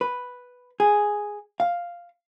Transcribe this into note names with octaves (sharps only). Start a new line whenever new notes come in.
B4
G#4
F5